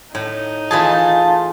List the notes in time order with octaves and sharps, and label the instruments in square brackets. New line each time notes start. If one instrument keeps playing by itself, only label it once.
[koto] A2 [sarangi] D#4
[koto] E3 A3 G#4 [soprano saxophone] F4 [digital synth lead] A5